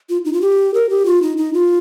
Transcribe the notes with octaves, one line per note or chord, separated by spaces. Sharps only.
F4
D#4
F4
G4
A#4
G4
F4
D#4
D#4
F4